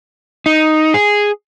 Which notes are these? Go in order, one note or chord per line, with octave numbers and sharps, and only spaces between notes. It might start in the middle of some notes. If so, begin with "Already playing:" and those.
D#4
G#4